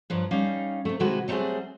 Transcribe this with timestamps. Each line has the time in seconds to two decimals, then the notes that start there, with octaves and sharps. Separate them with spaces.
0.10 G2 F3 F#3
0.31 G3 C#4 D#4 F5
0.85 C3 A3
1.00 C3 D#3 G#3 E4 F#4 B4
1.28 F#3 G3 A3 C4 F#4 G#4